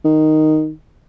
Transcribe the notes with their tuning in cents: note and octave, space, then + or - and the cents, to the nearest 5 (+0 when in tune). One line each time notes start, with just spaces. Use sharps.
D#3 -5